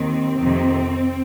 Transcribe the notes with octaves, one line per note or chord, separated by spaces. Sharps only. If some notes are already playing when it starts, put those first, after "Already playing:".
Already playing: D#2 D#3 C4
F2 C3 D#3